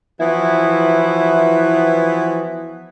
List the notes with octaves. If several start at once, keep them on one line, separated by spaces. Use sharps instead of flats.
E3 F3 B3 E4 F#4